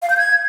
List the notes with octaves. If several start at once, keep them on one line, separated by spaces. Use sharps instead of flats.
F5
G6
G#6